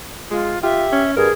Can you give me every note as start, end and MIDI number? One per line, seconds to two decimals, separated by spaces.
0.31 0.55 56
0.31 0.62 65
0.63 0.86 65
0.63 1.02 67
0.63 1.11 76
0.92 1.15 61
1.17 1.28 43
1.17 1.33 68
1.17 1.31 70